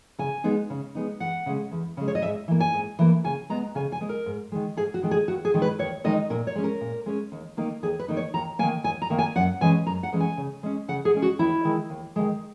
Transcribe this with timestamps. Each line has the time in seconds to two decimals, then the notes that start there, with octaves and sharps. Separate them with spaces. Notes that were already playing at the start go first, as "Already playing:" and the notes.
0.18 C#3 G#5
0.44 G#3 B3 D#4
0.70 C#3
0.95 G#3 B3 D#4
1.20 E2 F#5
1.46 C#3 G#3
1.72 E2
1.97 C#3 G#3
2.08 C#5
2.15 D#5
2.22 G#2 E5
2.48 E3 A#3
2.60 G#5
2.74 G#2
2.99 E3 A#3
3.24 C#3 G#5
3.50 G#3 B3 A#5
3.75 C#3 G#5
3.92 G#5
4.01 G#3 B3
4.09 A#4
4.26 G#2
4.52 D#3 G#3
4.77 G#2 G#4
4.94 F#4
5.03 D#3 G#3
5.11 G#4
5.28 D#2 F#4
5.45 G#4
5.54 D#3 G#3 D#4
5.62 B4
5.79 D#2 C#5
6.04 D#3 G#3 D#4 D#5
6.30 A#2 A#4
6.47 C#5
6.56 G#3 C#4
6.64 A#4
6.81 A#2
7.06 G#3 C#4
7.32 D#2
7.57 D#3 A#3 D#4
7.83 D#2 G#4
7.99 B4
8.08 D#3 A#3 D#4
8.17 C#5
8.34 D#2 A#5
8.59 A#3 G#5
8.63 D#3
8.84 D#2 G#5
9.02 A#5
9.10 D#3 A#3
9.18 G#5
9.36 F#2 F#5
9.61 E3 G#3 C#4 G#5
9.86 F#2 A#5
10.03 F#5
10.12 E3 G#3 C#4
10.20 G#5
10.37 C#3
10.63 G#3 C#4
10.88 C#3 F#5
11.05 G#4
11.14 G#3 C#4
11.22 F#4
11.39 D#2 E4
11.65 D#3 G#3
11.90 D#2
12.16 D#3 G#3